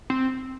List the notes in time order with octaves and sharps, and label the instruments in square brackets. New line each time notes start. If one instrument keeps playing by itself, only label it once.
[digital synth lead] C4